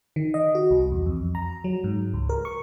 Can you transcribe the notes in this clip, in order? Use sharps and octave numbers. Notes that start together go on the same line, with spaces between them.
D#3
D#5
F#4
C2
E2
F2
A#5
F#3
G#2
C#2
A#4
C#6